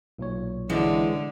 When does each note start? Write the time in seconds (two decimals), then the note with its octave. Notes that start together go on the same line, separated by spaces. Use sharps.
0.19 B1 A#2 C#5
0.70 D3 E3 G#3